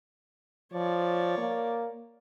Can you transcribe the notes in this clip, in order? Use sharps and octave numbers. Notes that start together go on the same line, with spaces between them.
F3 C#5 D5
A#3